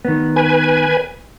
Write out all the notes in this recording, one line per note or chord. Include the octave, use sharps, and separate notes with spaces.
D#3 B3
B4 G#5